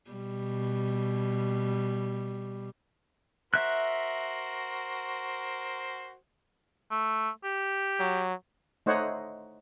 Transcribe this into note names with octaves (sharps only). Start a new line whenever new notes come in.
B2 G3
F#4 A#4 C5 E5 F#6
A3
G4
F#3
A3 D#4 C5 C#5 D#5 F#5